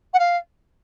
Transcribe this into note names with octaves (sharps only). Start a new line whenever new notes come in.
F#5
F5